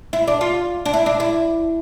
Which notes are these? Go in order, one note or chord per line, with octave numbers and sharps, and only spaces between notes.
E4
D4
F4
D4
E4
D4
E4